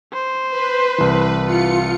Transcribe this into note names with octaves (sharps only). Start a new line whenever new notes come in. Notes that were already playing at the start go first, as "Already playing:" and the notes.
C5
B4
C2 E3
F4 C#7